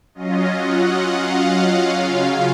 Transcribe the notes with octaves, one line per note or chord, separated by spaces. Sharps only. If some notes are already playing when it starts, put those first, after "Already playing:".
F#3 C#4 F4 D#5
F#5
F5
F5
C#3 F#3 C#4 F4 F5